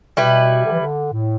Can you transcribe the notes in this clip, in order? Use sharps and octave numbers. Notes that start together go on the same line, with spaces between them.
B2 G3 E4 B4
D3
E3
D3
A2